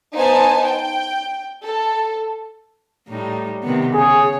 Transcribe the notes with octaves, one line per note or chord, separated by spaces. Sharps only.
B3 D#4 C5 F5 G#5 A5
G5
A4
A2 G3 D#4
C3 D#3 B3
C#3 G#4 C#5